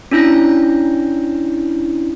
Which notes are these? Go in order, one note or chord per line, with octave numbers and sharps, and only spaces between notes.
C#4 D4 E4 G6 A#6